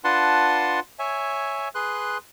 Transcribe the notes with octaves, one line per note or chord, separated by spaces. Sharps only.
D4 F4 B4 F#5 A5 C6
C#5 E5 G#5
G#4 B4 C6 F#6